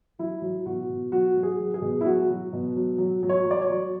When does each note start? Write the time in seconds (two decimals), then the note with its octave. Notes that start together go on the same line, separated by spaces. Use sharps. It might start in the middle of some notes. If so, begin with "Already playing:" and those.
0.19 F#3 E4
0.42 F#3
0.66 B2 F#4
0.89 B2
1.12 F#3 F#4
1.36 F#3
1.43 G#4
1.60 F#3
1.74 G#4
1.82 B2
2.01 E4
2.06 F#3 F#4
2.29 F#3
2.53 B2
2.76 F#3
2.98 F#3
3.23 F#3
3.29 C#5
3.46 F#3
3.51 D5
3.61 C#5
3.69 F#3